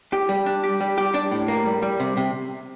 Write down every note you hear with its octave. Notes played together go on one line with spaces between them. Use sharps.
G4
G3
D4
G4
G3
G4
D4
A2
A#3
G3
G3
C3
C3